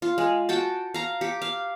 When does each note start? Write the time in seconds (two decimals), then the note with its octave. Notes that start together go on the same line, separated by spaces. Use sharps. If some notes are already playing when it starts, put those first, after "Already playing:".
0.02 F4
0.18 G#3
0.49 F#4 G5 A5
0.94 F5 A#5
1.21 G4
1.42 F5